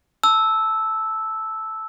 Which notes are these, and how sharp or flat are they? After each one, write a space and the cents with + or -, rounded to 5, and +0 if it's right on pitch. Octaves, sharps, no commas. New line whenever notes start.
A5 +0 E6 -10